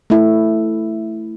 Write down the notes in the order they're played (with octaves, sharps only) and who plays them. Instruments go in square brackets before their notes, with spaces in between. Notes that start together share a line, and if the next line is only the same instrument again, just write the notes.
[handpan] A3 E4